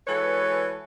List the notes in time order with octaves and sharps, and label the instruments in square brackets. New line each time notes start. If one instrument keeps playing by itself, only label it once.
[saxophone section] E3 G#3 F#4 A4 B4 C#5